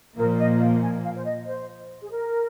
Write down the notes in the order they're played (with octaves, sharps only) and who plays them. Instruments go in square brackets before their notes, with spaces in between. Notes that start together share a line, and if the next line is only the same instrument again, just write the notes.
[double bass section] A#2 F3 A#3 [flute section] A#4
[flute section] D#5
F5
G#5
F5
C5
D#5
C5
G#4
A#4